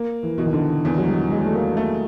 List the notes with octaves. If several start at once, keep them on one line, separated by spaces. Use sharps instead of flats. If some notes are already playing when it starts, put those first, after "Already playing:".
Already playing: A#3
E3
B2 E3
D#3
D3
E2 E3
F#3
G3
F#3 G#3
A3
A#3
A3